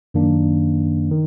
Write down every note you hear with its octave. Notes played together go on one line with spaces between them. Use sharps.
F#2 D#3 A#3 D4
D#3